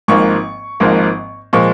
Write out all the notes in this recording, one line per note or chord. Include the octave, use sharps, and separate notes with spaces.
G#1 G#2 F3 A#3 C#6
G#1 G#2 F3 A#3
A#2 F3 G#3 C#6